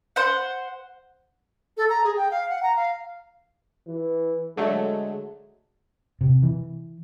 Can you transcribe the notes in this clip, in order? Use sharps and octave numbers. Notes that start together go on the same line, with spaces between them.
C5 F#5
A4
A#5
G#4
G5
F5
F#5
A#5
F5
E3
D3 F#3 G#3 A3
C3
E3